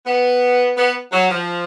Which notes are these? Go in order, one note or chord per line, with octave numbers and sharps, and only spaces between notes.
B3
B3
F#3
F3